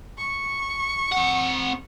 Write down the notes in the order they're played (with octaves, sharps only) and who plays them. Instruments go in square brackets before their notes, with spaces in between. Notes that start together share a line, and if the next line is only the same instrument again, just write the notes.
[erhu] C#6
[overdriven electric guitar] C4 F#5